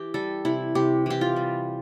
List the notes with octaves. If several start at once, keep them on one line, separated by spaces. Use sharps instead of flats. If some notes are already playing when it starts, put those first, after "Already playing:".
Already playing: E3 G4
G3 A4
C3 E4
C3 G4
E3 G4
F4
G3